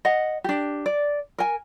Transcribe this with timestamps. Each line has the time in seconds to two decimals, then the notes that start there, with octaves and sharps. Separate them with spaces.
0.05 D#5 F#5
0.44 D4 G4
0.86 D5
1.38 A#4 G#5